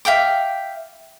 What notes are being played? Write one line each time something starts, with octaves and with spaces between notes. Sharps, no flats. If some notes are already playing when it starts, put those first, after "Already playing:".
E5 F5 G5 D6